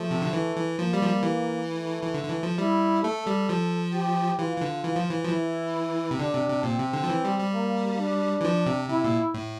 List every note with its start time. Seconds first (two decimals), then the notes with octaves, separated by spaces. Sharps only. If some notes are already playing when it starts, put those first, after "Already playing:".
Already playing: F3 A3
0.11 C3
0.22 D3
0.33 E3
0.56 E3
0.79 F3 A#3
0.93 G3
1.02 F3
1.08 G3
1.23 E3
1.68 A3
2.03 E3
2.14 D3
2.24 D3
2.29 E3
2.43 F3
2.58 G3 E4
3.03 A3 A4
3.27 G3
3.49 F3
3.94 G4
4.39 E3 F4
4.57 E3
4.62 D3
4.84 E3
4.96 F3
5.10 E3
5.24 F3
5.29 E3 E4
6.11 C3
6.19 D3 D4
6.33 C3
6.48 C3
6.63 A#2 C4
6.79 C3
6.93 D3
7.04 F3
7.09 E3
7.25 G3
7.39 G3
7.54 A#3
7.98 D4
8.41 E3
8.45 F3
8.66 C3
8.89 C3 E4
9.04 A#2
9.34 A2